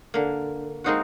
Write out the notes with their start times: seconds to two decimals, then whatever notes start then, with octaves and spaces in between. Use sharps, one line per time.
0.14 D3 A#3
0.84 G#3 A#3 C4 D#4 F4 F#4